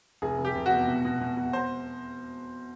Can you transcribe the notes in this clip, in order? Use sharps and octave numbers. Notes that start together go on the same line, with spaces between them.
F1 G#4
F1
G4
F1
F#4
E2
B2
B2
B2
B2
C5